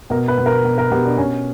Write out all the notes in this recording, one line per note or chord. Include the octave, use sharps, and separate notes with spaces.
B2 A#4
B4
B2
A#4
B2
A#4
B2 G4
D4
B2 C#4